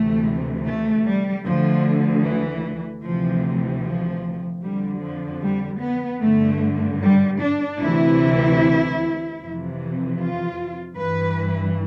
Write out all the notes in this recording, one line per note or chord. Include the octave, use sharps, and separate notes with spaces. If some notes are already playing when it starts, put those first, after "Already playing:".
Already playing: D2 C3 E3 A3
A3
G3
D2 D3 F3
E3
D2 C3 E3 F3
F3
F2 D3 G3
F3
G3
B3
G2 D3 A3
G3
D4
D2 C3 E3 E4
F2 C3 E3
F4
G2 E3 B4